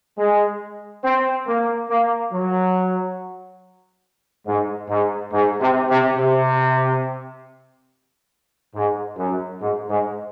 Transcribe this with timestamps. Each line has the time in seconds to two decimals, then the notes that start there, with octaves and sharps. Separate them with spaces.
0.18 G#3
1.04 C4
1.47 A#3
1.90 A#3
2.32 F#3
4.46 G#2
4.89 G#2
5.33 G#2
5.61 C3
5.89 C3
6.18 C3
8.75 G#2
9.18 F#2
9.61 G#2
9.89 G#2